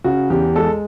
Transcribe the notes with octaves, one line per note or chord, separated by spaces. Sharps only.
C#3 F#4
E2 G4
G#3 A4